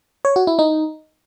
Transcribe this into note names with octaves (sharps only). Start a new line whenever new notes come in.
C#5
F#4
E4
D#4